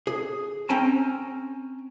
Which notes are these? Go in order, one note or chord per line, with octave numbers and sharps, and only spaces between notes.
G#4
C4 C#4 G5 G#5 A#5